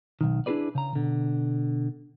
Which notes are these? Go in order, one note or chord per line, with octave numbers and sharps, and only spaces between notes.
B1 F#2 D#3
D4 E4 F4 G#4 B4 D5
C#3 A#5
B2 D3